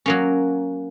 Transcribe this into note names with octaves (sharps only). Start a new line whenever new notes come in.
F#3 A#3 C#4